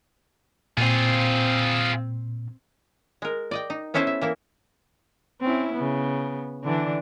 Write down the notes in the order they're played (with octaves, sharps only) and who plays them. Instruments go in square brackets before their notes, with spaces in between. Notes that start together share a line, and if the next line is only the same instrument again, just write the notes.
[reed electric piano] A#2 [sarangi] C4 [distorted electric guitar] F4 G#4
[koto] G#3 A#4
D5 D#5 G5
D#4
B3 C#4 E4 A4 C5 E5
E5
E3 A#3 E4
[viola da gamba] C4 C#4 E4
C#3 B3
D3 E3 D4